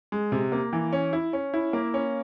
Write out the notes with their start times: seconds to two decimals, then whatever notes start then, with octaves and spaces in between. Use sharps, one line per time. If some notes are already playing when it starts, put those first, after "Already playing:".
0.12 G#3
0.32 C3
0.52 A#3
0.73 E3
0.93 C#4
1.13 E4
1.33 C#4
1.54 E4
1.73 A#3
1.94 C#4